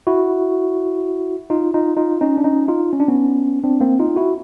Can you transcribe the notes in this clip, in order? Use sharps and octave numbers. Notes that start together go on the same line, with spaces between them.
E4 F#4
D#4 F4
D#4 F4
D#4 F4
C#4 D#4
D4
C#4 D#4
D#4 F4
C#4
D4
B3 C#4
C4 D4
A#3 C4
D#4 F4
E4 F#4